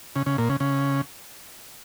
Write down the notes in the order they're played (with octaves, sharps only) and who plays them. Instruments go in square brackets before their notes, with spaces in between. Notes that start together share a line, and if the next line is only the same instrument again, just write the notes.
[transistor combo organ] C#3
C#3
A#2
C#3
C#3